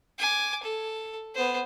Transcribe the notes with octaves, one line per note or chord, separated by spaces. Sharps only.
G#5 D6
A4
B3 C5